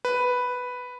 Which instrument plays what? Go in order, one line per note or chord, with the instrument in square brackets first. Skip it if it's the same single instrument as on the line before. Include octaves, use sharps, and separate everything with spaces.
[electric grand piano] B4